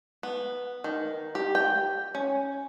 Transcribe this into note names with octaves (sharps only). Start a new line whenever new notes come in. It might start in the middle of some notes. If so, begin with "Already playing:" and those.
B3
D#3
G4
G5
C#4